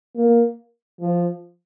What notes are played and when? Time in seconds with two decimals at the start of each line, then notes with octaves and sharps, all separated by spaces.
0.16 A#3
1.00 F3